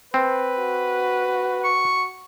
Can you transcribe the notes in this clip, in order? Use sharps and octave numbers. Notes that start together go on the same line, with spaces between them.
C4 B4
F#4
C#6